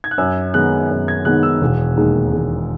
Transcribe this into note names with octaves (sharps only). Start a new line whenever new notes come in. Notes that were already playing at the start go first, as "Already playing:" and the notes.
G#6
F#6
F#2 E6
D#3 G#3 B3 D#4 F#6
F#2
G#6
D#3 G#3 B3 D#4 F#6
E6
E1
D#2 D#3 G#3
E1